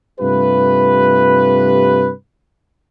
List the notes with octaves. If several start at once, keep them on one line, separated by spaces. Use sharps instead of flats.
G2 C3 A3 F4 G4 B4